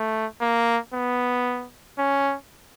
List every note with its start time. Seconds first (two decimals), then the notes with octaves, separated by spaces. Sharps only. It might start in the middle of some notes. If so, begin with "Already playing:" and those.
Already playing: A3
0.41 A#3
0.94 B3
1.99 C#4